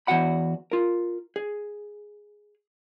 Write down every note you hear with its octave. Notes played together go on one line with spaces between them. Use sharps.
E2 G2 F#4 F#5 B5
F4 A#4
G#4